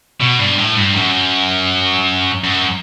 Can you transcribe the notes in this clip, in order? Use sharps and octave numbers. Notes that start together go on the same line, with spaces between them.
B2
G2
A2
G2
F#2
F#2